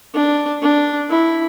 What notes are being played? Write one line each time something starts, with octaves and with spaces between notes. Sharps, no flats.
D4
D4
E4